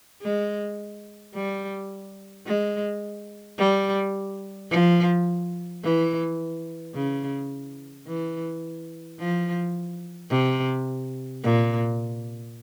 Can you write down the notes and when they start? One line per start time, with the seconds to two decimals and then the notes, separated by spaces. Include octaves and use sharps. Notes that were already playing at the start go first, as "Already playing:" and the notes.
0.22 G#3
1.35 G3
2.47 G#3
3.58 G3
4.70 F3
5.83 E3
6.94 C#3
8.07 E3
9.19 F3
10.30 C3
11.43 A#2